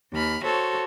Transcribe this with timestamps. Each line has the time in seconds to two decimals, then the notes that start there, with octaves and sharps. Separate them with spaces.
0.13 D#2 B5 F6
0.44 F#4 A4 C5 C#5